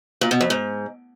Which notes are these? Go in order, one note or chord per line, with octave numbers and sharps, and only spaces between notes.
A#2
B2
F2
G#2